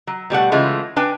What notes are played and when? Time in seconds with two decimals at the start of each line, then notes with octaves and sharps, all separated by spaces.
0.07 F#3
0.30 B2 G3 A3 F#5
0.52 C#3 E3 G#3 A3 F4
0.96 D4 B4 G5 G#5